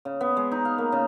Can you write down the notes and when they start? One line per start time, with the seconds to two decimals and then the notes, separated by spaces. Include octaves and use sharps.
0.05 C#3
0.21 B3
0.37 G#3
0.52 D#4
0.65 F5
0.78 A#3
0.92 C#3